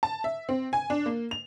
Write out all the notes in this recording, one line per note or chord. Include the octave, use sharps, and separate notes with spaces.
A5
E5
C4
G#5
D4
A#3
F7